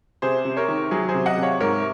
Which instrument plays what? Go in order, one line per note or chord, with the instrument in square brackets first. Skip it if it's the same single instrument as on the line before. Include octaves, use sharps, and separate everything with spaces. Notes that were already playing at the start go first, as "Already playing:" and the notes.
[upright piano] C3 G#4 C5
C3
A#4 C#5
D#3
F#3 G#4
G#4 C5
C3
D#5 F#5
C3
C#5 F5
G#2 A#4 C#5